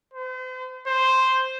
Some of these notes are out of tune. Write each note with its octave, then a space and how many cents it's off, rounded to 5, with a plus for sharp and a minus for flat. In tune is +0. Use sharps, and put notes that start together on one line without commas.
C5 -40
C5 +0